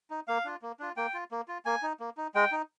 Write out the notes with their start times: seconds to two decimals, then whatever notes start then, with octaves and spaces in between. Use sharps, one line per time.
0.10 D#4
0.28 A#3 F5
0.45 D4 F4
0.62 A#3
0.80 D4 F4
0.97 A#3 G5
1.14 F4
1.31 A#3
1.48 F4
1.65 A#3 G#5
1.83 D#4
2.00 A#3
2.17 D#4
2.35 G#3 G5
2.52 D#4